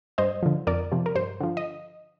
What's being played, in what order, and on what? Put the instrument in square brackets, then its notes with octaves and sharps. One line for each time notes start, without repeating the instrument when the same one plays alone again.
[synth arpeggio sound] G2 C5 D#5
D3 F3
F2 A#4 D5
C3 F3
A#4
G2 C5
D3 F3
D#5